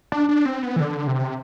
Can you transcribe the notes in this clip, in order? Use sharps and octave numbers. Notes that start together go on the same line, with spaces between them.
D4
D4
C4
B3
E3
D3
C3